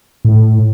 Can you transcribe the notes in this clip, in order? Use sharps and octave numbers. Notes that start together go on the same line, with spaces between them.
A2